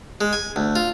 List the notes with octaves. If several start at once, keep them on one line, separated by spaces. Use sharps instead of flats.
G#3
G#5
D2
F4